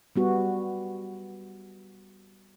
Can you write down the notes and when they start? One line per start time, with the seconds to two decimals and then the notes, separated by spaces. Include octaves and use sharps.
0.16 G3 B3 F#4